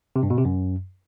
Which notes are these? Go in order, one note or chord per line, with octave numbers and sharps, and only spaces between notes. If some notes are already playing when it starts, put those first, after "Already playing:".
C3
G2
B2
C3
F#2